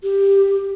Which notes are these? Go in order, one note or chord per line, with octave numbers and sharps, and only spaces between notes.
G4